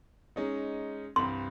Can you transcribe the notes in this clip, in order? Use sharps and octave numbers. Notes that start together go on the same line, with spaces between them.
G#3 C#4 D#4
C2 G2 C6